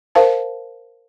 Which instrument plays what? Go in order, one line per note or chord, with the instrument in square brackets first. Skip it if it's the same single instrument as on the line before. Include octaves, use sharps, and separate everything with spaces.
[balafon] A#4 C5 F5 A5